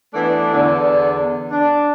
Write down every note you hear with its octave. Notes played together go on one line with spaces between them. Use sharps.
E3 A3 B3 D4
E2 D3
D4